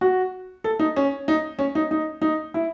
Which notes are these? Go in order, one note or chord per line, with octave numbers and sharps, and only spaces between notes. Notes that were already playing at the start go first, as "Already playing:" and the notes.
F#4
A4
D#4
C#4
D#4
C#4
D#4
D#4
D#4
E4